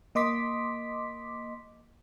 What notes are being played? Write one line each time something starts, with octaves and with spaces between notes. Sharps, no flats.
A#3 D#5 C6 D6 B6